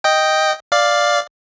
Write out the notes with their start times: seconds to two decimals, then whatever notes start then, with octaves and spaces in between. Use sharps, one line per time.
0.04 D#5 G5
0.72 D5 F5